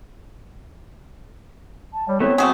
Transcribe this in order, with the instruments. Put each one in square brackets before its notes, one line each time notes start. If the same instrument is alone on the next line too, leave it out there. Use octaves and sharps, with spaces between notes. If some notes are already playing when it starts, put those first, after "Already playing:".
[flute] A5
[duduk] G3 [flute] C#5
[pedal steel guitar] A3 B3 E4 [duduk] C4 [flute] C#5
[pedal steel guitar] F#3 B3 B4 [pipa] A3 F#4 G#4 [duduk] C4